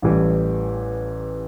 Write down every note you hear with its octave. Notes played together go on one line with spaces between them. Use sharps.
A1 A2 E3 G3